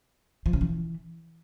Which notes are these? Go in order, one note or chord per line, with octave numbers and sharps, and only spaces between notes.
F3
C#3
E3